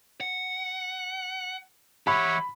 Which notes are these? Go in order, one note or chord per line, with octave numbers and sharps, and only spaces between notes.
F#5
E3 G4 C#5 E5 F#5 B5